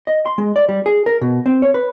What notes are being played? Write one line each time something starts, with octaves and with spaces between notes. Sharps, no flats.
D#5
C6
G#3
D5
G3
G#4
A#4
B2
C4
C#5
B4